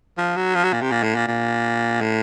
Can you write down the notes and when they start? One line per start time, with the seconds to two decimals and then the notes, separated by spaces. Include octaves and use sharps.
0.18 F3
0.37 F#3
0.55 F3
0.64 F#3
0.73 A#2
0.82 C3
0.91 A#2
1.03 A2
1.15 A#2
1.28 A#2
2.01 A2